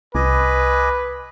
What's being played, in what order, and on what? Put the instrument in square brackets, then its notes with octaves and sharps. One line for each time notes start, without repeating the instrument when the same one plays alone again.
[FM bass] C2 [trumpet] B4 [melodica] D#5 G#5 D6